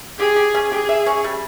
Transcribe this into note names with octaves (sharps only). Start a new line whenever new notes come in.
G4 G#4
G4
C#4
G4 G#4
E5
C#4
G3